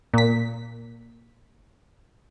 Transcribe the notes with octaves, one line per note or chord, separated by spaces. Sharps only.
A#2 B6